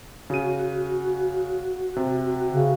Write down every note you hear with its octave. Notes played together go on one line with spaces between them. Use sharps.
C#3 F#4 D#7
C3
C#3